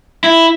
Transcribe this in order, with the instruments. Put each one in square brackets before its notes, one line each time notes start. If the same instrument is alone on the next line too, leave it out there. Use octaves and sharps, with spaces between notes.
[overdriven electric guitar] E4